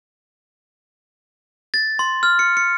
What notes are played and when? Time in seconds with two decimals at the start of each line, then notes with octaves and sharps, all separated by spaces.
1.74 A6
1.99 C6
2.23 F6
2.39 C#7
2.57 C#7